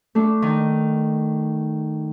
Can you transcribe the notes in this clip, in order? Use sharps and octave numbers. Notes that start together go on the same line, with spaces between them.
A3 D4
D#3